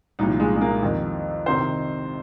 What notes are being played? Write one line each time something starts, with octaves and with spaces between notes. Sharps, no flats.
C2 A#2 F3 D#4
G#3
G#3
A#3
F2 D#3
C3 D#3 C5